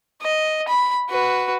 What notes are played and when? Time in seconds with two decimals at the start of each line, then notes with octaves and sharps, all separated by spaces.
0.22 D#5
0.68 B5
1.09 F#4 B4